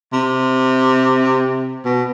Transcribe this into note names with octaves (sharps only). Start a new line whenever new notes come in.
C3
B2